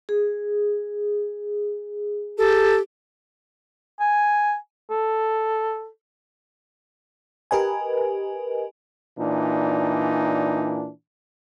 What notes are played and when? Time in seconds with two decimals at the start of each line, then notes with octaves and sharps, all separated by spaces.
0.09 G#4
2.38 G4 A4
4.00 G#5
4.90 A4
7.51 G4 A#4 B4 D#5 G#5
9.18 A#2 E3 D4 D#4